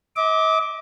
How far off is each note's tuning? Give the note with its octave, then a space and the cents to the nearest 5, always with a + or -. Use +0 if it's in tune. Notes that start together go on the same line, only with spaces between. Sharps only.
D#5 +45 D6 +0